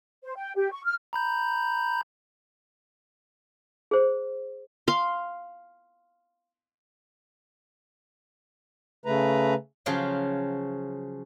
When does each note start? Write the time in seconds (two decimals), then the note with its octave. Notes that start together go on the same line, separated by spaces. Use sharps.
0.23 C5
0.36 G5
0.56 G4
0.72 C#6
0.84 F6
1.13 A#5 B5 G6
3.91 G#4 C5
4.88 F5 C6
9.06 C#3 A3 B4 A#5
9.86 C#3 F3 F#3 F4 G5